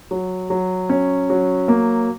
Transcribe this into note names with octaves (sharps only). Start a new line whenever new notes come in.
F#3
F#3
C#4
F#3
A#3